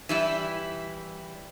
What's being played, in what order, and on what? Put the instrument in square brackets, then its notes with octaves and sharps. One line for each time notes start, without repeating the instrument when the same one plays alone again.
[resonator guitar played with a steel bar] E3 G3 E4